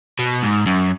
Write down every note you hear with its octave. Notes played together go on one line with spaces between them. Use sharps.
B2
G#2
F#2